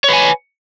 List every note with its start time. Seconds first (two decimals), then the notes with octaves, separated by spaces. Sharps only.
0.04 C#5
0.09 B4
0.13 G#5